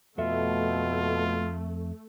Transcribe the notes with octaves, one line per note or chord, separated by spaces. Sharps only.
F2 B2 A3 F4 A4 E5